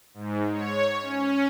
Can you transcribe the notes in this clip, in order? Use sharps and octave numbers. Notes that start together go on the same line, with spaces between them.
G#2
C#5
C#4